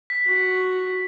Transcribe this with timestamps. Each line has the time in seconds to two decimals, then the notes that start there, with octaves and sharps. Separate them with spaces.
0.10 B6
0.27 F#4